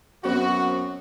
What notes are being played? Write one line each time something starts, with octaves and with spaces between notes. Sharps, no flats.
F#2 B3 C4 F#4